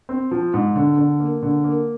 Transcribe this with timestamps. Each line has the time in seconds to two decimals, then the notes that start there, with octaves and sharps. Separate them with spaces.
0.09 C4
0.31 F3
0.54 G#2
0.76 D3
0.97 D3
1.20 A#3
1.43 D3
1.64 A#3